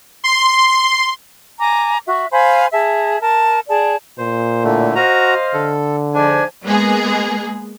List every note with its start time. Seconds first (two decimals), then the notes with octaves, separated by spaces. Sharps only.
0.24 C6
1.60 G#5 A#5 D6
2.07 F#4 E5
2.31 C5 F5 G#5 B5
2.72 G#4 E5 A5
3.20 A#4 A5
3.69 G#4 D5 A5
4.18 A#2 C5
4.63 A2 D3 A3
4.95 F#4 C5 D#5 F5 A#5
5.54 D3 A4
6.14 G#2 F3 D4 G#5
6.63 G#3 A#3 B3 G#4